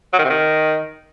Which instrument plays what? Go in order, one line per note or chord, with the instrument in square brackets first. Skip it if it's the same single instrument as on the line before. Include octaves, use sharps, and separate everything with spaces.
[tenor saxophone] F#3
D#3
C3
D#3